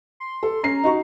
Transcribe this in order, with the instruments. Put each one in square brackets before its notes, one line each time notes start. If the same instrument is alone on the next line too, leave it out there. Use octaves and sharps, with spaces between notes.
[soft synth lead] C6
[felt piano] A4
[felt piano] C#4 C7 [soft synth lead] A#5
[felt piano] D#4 F#4 C#6